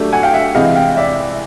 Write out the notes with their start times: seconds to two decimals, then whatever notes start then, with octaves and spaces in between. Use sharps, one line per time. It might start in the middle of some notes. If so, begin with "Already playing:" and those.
Already playing: F#3 A3 D4 G4
0.13 F#5 G#5
0.23 F5 G5
0.34 E5 F#5
0.55 C3 E3 G#3 D#5 F5
0.75 F5 G5
0.97 D5 E5